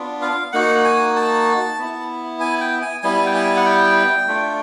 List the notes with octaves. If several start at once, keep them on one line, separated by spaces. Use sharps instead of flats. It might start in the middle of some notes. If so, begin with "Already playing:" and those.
Already playing: B3 D4 F4
F5
A#3 D#4 F#4 F#5
G#5
A5
B3 E4
G#5
G5
G#5
G3 B3 E4 G#5
G5
G#5
F#5
G5
A3 D4 F4